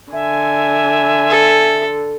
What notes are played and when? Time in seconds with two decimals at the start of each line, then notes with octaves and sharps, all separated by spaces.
0.13 D3 E5 G#5
1.30 A4